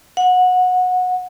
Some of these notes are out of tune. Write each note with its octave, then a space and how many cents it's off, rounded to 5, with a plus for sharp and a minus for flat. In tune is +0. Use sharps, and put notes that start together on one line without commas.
F#5 -20